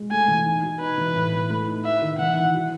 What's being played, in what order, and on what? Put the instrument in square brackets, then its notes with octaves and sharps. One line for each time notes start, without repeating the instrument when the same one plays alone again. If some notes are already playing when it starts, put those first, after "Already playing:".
Already playing: [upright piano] G#3
[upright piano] A3 [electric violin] G#5
[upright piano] E3
D#4
B2
[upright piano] D#4 [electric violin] B4
[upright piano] E3
A2
E4
A3
D#4
[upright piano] E4 [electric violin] E5
[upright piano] D#3
[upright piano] E3 [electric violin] F#5
[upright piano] E4
F#3